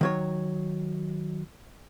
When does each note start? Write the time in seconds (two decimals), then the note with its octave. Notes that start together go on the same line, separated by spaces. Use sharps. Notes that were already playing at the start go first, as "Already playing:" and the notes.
0.01 D#3 F#3 C#5